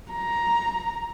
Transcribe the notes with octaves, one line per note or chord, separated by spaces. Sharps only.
A#5